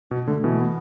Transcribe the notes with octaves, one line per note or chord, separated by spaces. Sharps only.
B2 B3
D3 A3
B2 E3
A3
B3